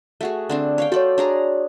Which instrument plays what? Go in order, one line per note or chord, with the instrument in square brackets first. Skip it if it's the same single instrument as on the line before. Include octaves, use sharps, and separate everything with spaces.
[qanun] A3 F#4 G#4
D3 C4 D4
C#5 F5 G5
[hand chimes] F#4 C#5 [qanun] A4 D5
[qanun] D4 G#4 A#5